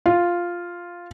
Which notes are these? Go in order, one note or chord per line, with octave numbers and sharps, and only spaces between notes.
F4